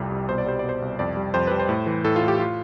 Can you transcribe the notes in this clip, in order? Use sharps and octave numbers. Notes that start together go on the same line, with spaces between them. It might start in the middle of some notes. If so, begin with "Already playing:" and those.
Already playing: C2 F2 C3 G3
C2
B2 C5
D5
G3 C5
B2 D5
C5
C2
F2 D5
G3
F2 C5
G3 B4
C5
A2
E3
A2 A4
F4
A2
G4
F4